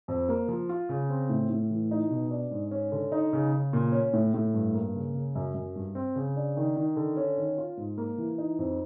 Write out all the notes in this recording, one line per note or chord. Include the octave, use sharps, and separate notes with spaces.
F2
A#3
F3
F4
C#3
C4
A2
A2
E3
D#4
B2
D4
G#2
C#4
D3
D#4
C#3
C#3
A#2
C#4
A2
A2
G2
A#3
C#3
C#3
F#2
F#2
G2
C4
C#3
D4
D#3
D#3
D3
C#4
D#3
F4
G#2
A#3
E3
D#4
F2